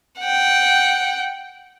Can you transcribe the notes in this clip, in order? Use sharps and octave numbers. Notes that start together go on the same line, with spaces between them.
F#5 G5